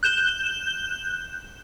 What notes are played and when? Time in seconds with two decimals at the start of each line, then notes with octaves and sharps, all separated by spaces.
0.03 F#6 G6 E7 G7